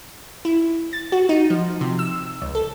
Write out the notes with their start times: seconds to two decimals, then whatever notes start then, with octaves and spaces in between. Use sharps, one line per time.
0.45 E4
0.93 A6
1.12 F#4
1.29 D#4
1.50 F3
1.81 C3
1.99 E6
2.42 C#2
2.55 A4